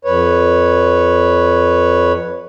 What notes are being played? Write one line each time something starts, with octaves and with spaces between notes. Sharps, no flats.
F2 B4 C#5